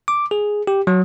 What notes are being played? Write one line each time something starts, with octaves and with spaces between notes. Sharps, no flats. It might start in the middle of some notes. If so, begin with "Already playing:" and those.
D6
G#4
G4
F#3